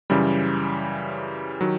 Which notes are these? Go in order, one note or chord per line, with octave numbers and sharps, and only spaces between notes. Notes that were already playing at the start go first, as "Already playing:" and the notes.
F#2 C#3 E3 G3
D#3 F#3